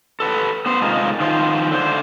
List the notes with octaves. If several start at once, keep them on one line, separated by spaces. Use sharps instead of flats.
A4 B4
B3 C5
C3 G#3 A#3 D#4 F4
D#3 F3 F4 C5
D3 C5